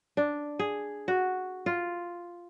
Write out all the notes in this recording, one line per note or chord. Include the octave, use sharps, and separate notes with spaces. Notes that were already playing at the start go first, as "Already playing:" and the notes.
D4
G#4
F#4
F4